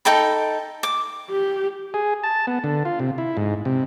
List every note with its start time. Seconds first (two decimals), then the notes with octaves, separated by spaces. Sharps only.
0.05 D#4 A4 G5 B5
0.83 D6
1.31 G4
1.94 G#4
2.24 A5
2.47 B3
2.64 D3
2.85 F4
3.00 C3
3.18 E4
3.37 G#2
3.65 C3